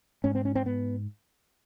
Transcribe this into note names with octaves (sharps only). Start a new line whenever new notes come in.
G#2 C#4
C4
C#4
C4
B3